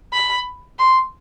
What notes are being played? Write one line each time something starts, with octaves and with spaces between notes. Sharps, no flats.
B5
C6